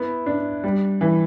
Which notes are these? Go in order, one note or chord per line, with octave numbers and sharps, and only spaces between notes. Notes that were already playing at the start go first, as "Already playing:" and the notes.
Already playing: B3 E4
D4
G3
E3